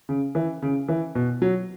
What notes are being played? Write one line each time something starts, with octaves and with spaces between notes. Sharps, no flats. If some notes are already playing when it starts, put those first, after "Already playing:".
C#3
E3
C#3
E3
B2
F#3